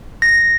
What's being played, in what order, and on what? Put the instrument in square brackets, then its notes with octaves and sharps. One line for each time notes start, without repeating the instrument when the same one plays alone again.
[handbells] A#6